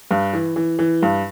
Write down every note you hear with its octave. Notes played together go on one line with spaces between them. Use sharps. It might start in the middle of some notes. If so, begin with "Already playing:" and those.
G2
E3
E3
E3
G2